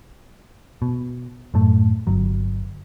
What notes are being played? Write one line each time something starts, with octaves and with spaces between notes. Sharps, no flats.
B2
F#2 A2 A3
G1 F#3